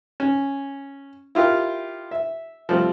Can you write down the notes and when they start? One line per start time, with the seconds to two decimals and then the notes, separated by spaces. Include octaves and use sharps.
0.20 C#4
1.35 E4 F4 G4 A#4
2.11 E5
2.69 F3 G3 A3 C4